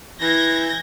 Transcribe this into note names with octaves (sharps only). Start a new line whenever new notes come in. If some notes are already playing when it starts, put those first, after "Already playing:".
E3 G6 G#6 A#6